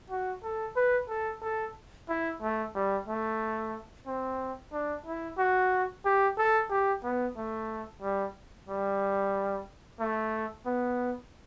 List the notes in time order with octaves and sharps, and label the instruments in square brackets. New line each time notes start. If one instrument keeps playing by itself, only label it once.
[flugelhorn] F#4
A4
B4
A4
A4
E4
A3
G3
A3
C4
D4
E4
F#4
G4
A4
G4
B3
A3
G3
G3
A3
B3